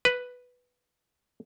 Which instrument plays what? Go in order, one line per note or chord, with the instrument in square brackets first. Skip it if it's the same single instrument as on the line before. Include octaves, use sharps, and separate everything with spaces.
[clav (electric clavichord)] B4